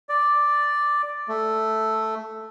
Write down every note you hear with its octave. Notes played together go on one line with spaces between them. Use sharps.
D5
A3